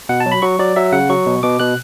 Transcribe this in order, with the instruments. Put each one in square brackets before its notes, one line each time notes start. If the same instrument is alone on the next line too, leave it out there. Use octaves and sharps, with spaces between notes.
[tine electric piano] B2 F#5
A5
F#3
B5
F#3 C#6
F#3 D5
F#3 E5
C#3 F#5
F#3 C#6
B2
B2 D6
B2 F#6